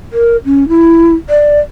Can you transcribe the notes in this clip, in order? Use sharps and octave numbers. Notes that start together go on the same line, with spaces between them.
A#4
C#4
E4
D5